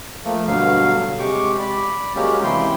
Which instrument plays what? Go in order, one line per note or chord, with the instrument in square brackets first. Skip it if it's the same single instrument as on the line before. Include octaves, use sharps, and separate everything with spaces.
[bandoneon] F3 A3 A#3
G2 B2 D3 F#3 F5
C3 G#3 G4 C#6 D6
D5 B5
F#3 G#3 A#3 C#4 G4
C3 E3 E4 G5 C6